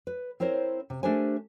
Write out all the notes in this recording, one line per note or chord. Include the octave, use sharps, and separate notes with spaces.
B4
C4 E4 A#4 C5 C#5
C3
A3 D4 G4 A#4 C5 G#5